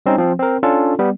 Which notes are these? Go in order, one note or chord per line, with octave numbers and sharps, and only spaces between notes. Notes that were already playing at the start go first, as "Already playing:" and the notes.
G3 C4 C#4 D#4
F3 C4
C4 A#4
C#4 D4 F4 A4
G3 B3